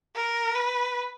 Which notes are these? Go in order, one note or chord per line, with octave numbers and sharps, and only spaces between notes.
A#4
B4